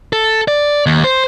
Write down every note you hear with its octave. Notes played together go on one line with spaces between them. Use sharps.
A4
D5
D#2
C5